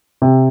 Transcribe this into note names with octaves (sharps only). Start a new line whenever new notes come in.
C3